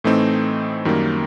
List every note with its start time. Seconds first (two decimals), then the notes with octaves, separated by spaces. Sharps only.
0.04 A2 E3 A3 C4 D#4
0.85 F#2 D#3 G3 A#3